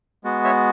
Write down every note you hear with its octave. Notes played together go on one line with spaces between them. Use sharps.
G#3 B3 F#4
C#5 E5